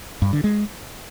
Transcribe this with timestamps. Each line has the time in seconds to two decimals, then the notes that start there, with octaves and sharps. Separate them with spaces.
0.22 G2
0.33 D3
0.44 G#3